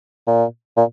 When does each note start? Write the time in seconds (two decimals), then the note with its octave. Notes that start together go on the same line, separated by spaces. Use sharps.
0.27 A#2
0.77 A#2